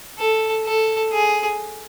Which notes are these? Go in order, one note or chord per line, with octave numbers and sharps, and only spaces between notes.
A4
A4
G#4